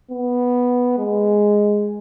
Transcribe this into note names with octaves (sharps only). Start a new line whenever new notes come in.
B3
G#3